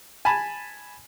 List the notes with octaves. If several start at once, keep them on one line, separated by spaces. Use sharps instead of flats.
G#5 A5 B5